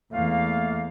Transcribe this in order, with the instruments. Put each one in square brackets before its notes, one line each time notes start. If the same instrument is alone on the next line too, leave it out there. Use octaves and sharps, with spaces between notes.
[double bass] E2 [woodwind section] A3 A#3 F5